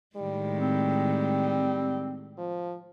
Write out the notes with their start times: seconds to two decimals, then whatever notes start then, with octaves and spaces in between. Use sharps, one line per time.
0.17 A2 D#3 G3 G#3
0.57 C4
2.38 F3